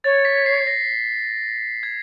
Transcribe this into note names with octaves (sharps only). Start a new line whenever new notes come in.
C#5 A6
B6
C7
A#6
G#6